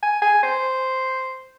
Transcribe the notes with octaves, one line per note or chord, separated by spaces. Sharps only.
G#5
G#5
C5